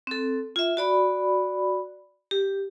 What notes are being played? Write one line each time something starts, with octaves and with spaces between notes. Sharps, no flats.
C4 A4
F4 E5
F#4 D5 B5
G4